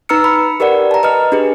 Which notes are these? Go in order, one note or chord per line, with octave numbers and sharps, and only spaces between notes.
D#4 B4 A#5 E6 F6 C#7
B5
G4 A#4 B4 D5 F#5
A5 A#5
B4 D#5 F6
D4 G4 G#4 B4